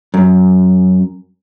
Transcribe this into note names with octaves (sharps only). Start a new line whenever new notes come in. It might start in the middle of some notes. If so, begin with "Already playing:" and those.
F#2